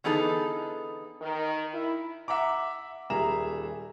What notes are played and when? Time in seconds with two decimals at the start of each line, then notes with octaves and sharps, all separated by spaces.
0.04 D3 E3 B3 D#4 G#4 A4
1.21 D#3
1.74 E4
2.28 E5 F#5 A#5 D6
3.10 D#1 G3 G#4 E5 A#5 E7